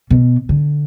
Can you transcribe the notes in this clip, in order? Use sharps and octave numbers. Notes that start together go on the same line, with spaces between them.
B2
D3